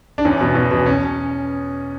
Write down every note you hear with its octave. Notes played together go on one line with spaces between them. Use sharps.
D4
E2 C#4
B2
E2
B2
C#4